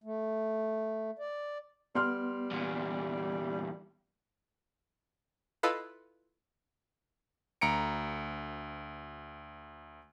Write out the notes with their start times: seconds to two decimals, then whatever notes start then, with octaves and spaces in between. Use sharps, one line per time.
0.04 A3
1.19 D5
1.95 G3 B3 C6 F6
2.51 E2 A#2
5.63 E4 F4 A4 B4 D#5 F5
7.61 D2 A#5 C#7 D7